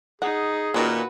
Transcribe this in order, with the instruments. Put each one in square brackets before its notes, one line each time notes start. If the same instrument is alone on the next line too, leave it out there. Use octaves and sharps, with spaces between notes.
[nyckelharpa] D#4 [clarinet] G#4 [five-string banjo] F#5
[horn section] A#2 [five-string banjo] D#3 C#4 [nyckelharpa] F#4 B4